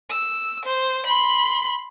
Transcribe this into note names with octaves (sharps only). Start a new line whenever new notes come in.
E6
C5
B5 C6